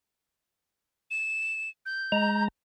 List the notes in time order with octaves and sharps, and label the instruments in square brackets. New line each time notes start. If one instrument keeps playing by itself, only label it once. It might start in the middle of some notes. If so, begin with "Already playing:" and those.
[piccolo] E7
G6
[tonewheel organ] G#3 A#5